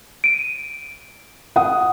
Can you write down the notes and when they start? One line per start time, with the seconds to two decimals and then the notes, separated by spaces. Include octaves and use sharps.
0.24 D7 D#7
1.56 F#5 D#6